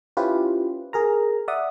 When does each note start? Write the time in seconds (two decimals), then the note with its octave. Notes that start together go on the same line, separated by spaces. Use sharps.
0.17 C#4 E4 F4 G4 B4 C5
0.93 G#4 A#4 A#5
1.48 D5 E5 F#5 D#6